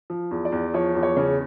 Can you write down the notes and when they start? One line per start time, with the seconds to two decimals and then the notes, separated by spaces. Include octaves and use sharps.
0.10 F3
0.31 E2
0.45 D5
0.52 E2
0.74 F3 C#5
0.95 E2
1.03 C#5
1.17 C#3